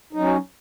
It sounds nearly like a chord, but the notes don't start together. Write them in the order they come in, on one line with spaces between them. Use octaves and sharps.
D#4 F#3 C#4